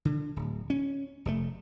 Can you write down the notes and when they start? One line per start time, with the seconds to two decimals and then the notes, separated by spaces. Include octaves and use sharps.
0.05 D3
0.36 D1
0.70 C#4
1.25 F1 D3 A3